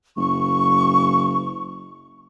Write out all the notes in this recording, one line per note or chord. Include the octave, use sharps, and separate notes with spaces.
F#1 C#6